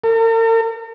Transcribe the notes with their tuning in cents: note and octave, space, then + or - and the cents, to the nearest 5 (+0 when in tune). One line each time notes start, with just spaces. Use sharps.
A#4 -45